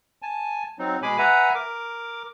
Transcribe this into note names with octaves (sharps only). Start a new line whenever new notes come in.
G#5 A5
F#3 C4 D#4
B2 G#3 G#4 G#5 B5 D6
B4 E5 F#5 G#5 A#5
A#4 D6